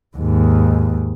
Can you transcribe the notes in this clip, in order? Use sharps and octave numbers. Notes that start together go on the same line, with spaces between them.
D#2 G#2